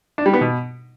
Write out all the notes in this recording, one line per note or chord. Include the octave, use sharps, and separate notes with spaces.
D4
G3
B3
B2